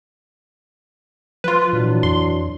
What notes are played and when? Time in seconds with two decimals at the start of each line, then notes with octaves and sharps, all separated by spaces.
1.44 F3 F4 B4
1.73 A#2 E3 F#3 D4
2.03 F2 C6